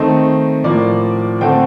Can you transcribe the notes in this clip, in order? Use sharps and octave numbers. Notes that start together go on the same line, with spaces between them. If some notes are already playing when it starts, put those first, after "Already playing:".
Already playing: D#3 A3 C4 D#5
A2 F3 A#3 D5
D3 A3 C4 G5